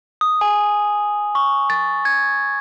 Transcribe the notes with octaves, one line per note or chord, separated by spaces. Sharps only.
D#6
G#5
C#6
A6
G#6